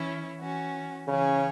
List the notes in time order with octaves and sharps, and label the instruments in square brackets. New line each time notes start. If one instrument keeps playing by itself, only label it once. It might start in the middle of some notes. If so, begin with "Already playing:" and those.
Already playing: [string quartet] E3 C#4 E4 C#5
E3 C#4 F#4
[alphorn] C#3 [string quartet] E3 C#4 G#4 C#5